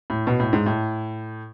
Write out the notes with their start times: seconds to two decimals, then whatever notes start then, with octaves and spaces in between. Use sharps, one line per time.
0.10 A2
0.27 B2
0.40 A2
0.53 G#2
0.66 A2